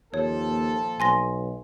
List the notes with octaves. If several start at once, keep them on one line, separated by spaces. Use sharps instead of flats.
D#2 A#2 F3 A4 C#5
B1 G#5 C6 A#6